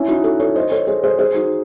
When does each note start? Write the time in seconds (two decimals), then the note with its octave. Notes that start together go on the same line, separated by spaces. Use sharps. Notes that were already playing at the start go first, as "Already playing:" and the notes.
Already playing: C#4 E4
0.08 D#4 F#4
0.24 F#4 A4
0.40 A4 C#5
0.55 C5 D#5
0.71 A4 C#5
0.87 G#4 C5
1.04 G#4 C5
1.19 G#4 C5
1.34 D#4 F#4